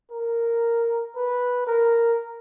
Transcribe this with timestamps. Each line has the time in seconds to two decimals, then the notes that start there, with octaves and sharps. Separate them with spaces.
0.11 A#4
1.16 B4
1.67 A#4